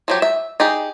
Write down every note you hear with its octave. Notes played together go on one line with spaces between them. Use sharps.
F3 F#3 G4
E5
D#4 G4 G#4